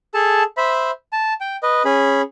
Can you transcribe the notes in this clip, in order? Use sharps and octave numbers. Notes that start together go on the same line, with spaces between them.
G#4 A4 A5
C5 E5 B5
A5
G5
B4 D#5
C#4 G#4 B5